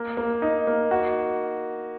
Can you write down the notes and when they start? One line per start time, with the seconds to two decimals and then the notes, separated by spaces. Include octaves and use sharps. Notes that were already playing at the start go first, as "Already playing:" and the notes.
Already playing: A#3
0.17 A#3
0.42 D#4
0.67 A#3
0.91 F#4